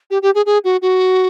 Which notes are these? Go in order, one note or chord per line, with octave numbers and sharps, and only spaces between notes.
G4
G4
G#4
G#4
F#4
F#4